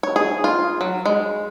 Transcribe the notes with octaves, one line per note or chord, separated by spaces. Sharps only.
C#5
G#4
F4
F#3
G#3